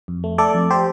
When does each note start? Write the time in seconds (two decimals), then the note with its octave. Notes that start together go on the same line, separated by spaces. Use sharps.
0.08 F2
0.24 A3
0.38 A3 A4 D5
0.54 F2
0.71 G4 C5